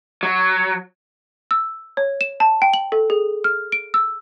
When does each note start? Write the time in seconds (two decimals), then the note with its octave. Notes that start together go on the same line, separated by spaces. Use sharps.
0.23 F#3
1.51 E6
1.97 C#5
2.21 E7
2.40 A5
2.62 G5
2.73 F#7
2.92 A4
3.10 G#4
3.44 F6
3.72 D7
3.94 E6